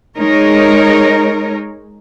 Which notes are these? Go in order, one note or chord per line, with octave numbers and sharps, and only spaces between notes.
G#3 D#4 A#4 C#5